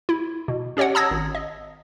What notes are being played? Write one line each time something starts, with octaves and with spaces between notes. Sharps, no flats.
E4
B2
C#4 G4 C#5 D#5 F#5
A5 A#5 D#6 E6 G#6 A#6
G#1
D#5